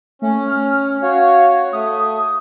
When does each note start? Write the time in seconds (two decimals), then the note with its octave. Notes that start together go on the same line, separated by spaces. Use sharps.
0.22 A3 C#4
0.48 F6
1.02 F#4 C#5 F5
1.73 A3 D#6